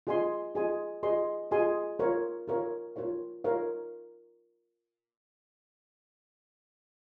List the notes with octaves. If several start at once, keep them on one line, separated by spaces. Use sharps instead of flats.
F4 G#4 D#5 G#5 C6
F4 G#4 D#5 G#5 C6
F4 G#4 D#5 G#5 C6
F4 G#4 D#5 G#5 C6
F4 A#4 C#5 F5
F4 A#4 C#5 F5
F4 A#4 C#5 F5
F4 A#4 C#5 F5